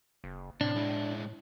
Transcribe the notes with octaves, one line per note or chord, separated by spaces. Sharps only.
F#1
A2 C3 D4
G#3 E4